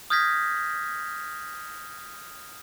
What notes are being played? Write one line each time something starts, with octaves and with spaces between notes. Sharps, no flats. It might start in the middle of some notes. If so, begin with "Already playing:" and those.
D#6 F6 G6 G#6 A#6 B6